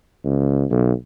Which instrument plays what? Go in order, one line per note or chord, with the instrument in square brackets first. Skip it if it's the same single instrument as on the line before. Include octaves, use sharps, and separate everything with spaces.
[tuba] C#2
B1